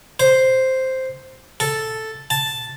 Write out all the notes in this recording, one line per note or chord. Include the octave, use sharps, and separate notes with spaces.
C5
A4
A5